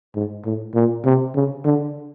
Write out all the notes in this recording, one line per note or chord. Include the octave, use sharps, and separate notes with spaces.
G#2
A2
A#2
C3
C#3
D3